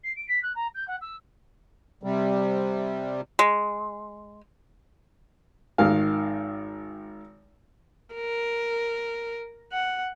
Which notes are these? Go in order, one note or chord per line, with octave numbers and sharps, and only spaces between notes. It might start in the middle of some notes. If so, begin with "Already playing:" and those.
C7
D7
B6
F#6
A#5
G6
F#5
E6
C3 G3
G#3
G#1 D#3 F5
A#4
F#5